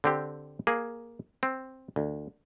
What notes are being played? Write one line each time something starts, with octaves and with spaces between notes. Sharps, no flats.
D3 C4 G4
A#3 G#4
C4
D2